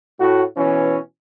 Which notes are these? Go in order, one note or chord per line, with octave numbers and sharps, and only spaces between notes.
A2 F#4
B2 E3 C#4